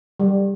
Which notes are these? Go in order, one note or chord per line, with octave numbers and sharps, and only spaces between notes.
G3